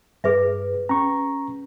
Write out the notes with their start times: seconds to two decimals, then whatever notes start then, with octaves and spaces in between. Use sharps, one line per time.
0.24 G2 G#4 B4 E5
0.89 C#4 A#5 C#6